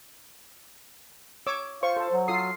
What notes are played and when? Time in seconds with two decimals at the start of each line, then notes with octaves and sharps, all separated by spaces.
1.46 C#5 D6 E6
1.83 F4 C5 C#6
1.97 A4 A5
2.12 F#3
2.28 F4 A4 D#6 C7